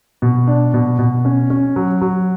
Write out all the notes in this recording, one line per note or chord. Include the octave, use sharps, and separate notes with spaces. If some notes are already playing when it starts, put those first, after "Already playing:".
B2
D4
B2
B2
C#4
C#4
F#3
F#3